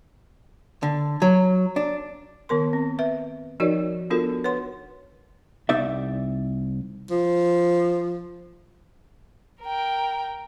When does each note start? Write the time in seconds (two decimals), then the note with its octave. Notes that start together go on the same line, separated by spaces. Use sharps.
0.83 D3
1.22 F#3
1.76 D4
2.49 D#3 B3 A#4 C6
2.73 C4
2.99 B4 E5
3.60 F3 D#4 F#4 A#4 C#5 D5
4.10 B3 D4 F4 F#4 A4 A#4
4.44 B4 C#5 F#5 C6
5.69 C2 D#4 D5 E5
7.10 F3
9.62 A#4 G5